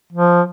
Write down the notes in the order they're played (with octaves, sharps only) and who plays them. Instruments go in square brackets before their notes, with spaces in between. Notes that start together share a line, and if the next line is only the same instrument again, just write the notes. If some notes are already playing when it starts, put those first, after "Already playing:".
[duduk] F3